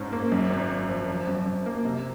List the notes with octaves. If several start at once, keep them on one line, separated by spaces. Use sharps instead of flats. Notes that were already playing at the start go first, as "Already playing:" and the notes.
Already playing: G#2 F3 C#4
A#3
F#2
G#1
G#1
F3
F3
F#2
F#2
A#3
C3